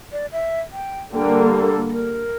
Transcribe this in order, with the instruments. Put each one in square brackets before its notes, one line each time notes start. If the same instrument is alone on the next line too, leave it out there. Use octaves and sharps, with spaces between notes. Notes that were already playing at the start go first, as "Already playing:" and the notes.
[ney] D5
E5
G5
[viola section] D3 G3 A#3 [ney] G5
[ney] A4
A4
A#4